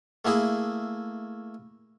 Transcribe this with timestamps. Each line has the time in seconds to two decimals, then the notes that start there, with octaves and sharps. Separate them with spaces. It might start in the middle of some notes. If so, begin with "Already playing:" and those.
0.25 A3 A#3 E4 G#4